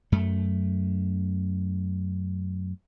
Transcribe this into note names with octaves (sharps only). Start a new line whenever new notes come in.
F#2 A3